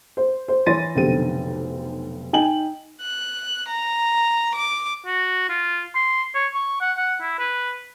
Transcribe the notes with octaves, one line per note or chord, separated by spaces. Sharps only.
C5
C5
E3 C#5 C6 A6 A#6 D#7
F1 B1 D3 C4 G4 D#7
D#4 G5 G#5 F#7
F#6
A#5
D6
F#4
F4
C6
C#5
C#6
F#5
F#5
E4
B4